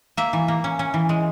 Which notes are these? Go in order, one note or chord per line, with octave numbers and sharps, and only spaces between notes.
A#3 E5
E3
A#3
C#4
C#4
E3
G#3